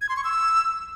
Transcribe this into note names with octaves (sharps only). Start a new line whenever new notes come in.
G#6
C6
C#6
E6